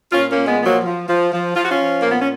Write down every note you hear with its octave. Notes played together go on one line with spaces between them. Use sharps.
A#2 C#4 F4
A#3 C#4
A#2
G#3 B3
F3 B3
F#3 A#3
F3
F3
F3
F3 F4
F#4
C#4 F4
F3
A#2 A#3
B3
C#4